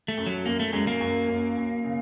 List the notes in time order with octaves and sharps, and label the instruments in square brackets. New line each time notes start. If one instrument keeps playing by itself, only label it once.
[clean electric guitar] A3
[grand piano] F#2
[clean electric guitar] F#3
[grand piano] F#2 [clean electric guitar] A#3
[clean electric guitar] A3
[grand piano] F#2 [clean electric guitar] G#3
[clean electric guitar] A#3
[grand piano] F#2
F#2
F#2
C#3